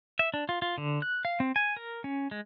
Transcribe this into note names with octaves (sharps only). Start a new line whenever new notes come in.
E5
D4
F4
F4
D3
F#6
F5
C4
G#5
A#4
C#4
G#3